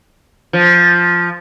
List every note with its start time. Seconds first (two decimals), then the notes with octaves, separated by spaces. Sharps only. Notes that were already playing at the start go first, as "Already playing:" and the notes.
0.53 F3